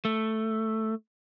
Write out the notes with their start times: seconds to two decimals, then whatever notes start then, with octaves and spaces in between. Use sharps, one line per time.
0.05 A3